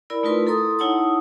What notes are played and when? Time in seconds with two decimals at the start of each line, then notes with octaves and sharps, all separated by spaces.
0.10 E4 A#4 D5 B5
0.23 A3 D#4 F4 A#4 B4 C6
0.46 E4 A4 A#5 C6 D#6
0.79 D#4 E4 C#5 F#5 A5 D#6